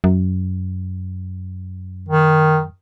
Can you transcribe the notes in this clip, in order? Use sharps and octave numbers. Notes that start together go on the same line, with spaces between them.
F#2
D#3